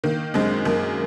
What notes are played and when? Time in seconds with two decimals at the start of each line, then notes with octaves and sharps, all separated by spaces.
0.04 D#3 A#3
0.34 F#2 G#3 C4
0.65 F#2 A#3